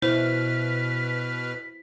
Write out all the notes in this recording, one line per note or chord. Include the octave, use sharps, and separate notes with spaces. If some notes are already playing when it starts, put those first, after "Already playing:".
B2 E4 B4 C5 F6 B6